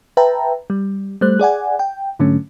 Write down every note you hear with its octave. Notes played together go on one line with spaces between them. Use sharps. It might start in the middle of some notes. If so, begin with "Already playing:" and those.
B4 E5 G5 A5 A#5
G3
G3 A3 C5 F#6
G#4 D5 F#5 G#5
G5
G#2 D3 F#3 A3 C#4